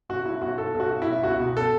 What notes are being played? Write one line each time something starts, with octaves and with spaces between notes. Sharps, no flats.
B1 F#4
B1 E4
B1 F#4
B1 A4
B1
F#4
B1
B1 E4
C#2 F#4
B2
A4